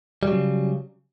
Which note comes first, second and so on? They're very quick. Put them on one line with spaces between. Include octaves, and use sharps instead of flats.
G3 F#3 C#3